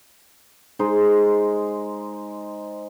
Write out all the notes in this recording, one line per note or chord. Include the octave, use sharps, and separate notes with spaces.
G#3 D#4 C5